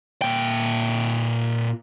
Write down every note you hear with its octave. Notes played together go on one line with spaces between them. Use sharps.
A#2 G5